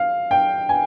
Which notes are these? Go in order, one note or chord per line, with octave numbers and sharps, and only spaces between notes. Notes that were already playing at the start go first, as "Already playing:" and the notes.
Already playing: F5
G5
G#5